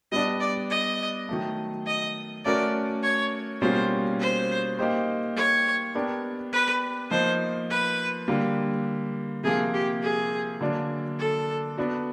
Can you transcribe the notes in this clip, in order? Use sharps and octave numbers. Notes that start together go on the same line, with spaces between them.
G3 B3 D4 D#5
D5
D#5
D#3 F#3 A3
D#5
A3 C#4 F#4 A#4 D5
C#5
B2 G3 A#3 C#4 F4 C5
C5
A#3 D#4 G4 C5
C#5
B3 D4 G4 A#4
B4
F3 A#3 D#4 C5
B4
D3 G3 A#3
C3 F3 A#3 G#4
G4
G#4
D3 F#3 A#3 D4
A4
B3 D4 F#4